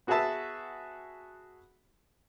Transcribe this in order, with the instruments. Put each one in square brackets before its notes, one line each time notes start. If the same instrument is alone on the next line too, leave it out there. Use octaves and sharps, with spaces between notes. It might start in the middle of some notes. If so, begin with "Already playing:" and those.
[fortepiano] B3 F#4 G#4 B4 E5 A5